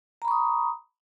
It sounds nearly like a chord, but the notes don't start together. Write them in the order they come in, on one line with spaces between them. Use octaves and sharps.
A#5 B5 C#6 D#6